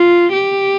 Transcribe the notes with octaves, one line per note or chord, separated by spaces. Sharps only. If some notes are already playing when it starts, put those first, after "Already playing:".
Already playing: F4
G4